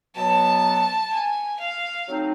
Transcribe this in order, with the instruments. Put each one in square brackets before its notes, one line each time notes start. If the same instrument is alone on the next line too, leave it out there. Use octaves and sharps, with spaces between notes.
[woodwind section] B2 F#3 B3 [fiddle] A5
[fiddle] G#5
F5
[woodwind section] F#3 A3 C4 D#4